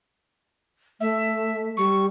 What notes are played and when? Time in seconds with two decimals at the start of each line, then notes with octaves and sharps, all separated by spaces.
1.00 A3 E5
1.77 G3 C#6